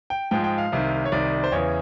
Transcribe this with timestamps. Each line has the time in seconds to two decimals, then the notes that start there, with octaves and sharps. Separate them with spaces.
0.10 G5
0.31 G#2 F3 G#3 G5
0.44 G5
0.58 F5
0.72 C2 C3 D#3
1.05 C#5
1.12 C2 C3 D#3 D5
1.44 C5
1.52 E2 C#3 E3 C#5